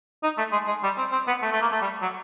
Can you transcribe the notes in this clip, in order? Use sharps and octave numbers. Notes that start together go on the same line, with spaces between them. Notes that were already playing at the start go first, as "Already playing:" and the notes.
D#4
A3
G#3
G#3
G3
C4
C4
B3
A3
A3
A#3
A3
G3
F#3